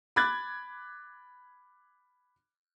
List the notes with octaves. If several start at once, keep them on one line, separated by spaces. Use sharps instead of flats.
B5 D6 F#6 G#6 A6